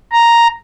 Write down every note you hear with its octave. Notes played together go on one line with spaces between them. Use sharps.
A#5